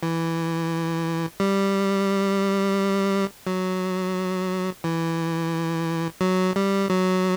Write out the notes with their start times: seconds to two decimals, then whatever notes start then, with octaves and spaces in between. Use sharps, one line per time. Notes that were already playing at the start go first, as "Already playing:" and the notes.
0.03 E3
1.40 G3
3.47 F#3
4.84 E3
6.21 F#3
6.56 G3
6.90 F#3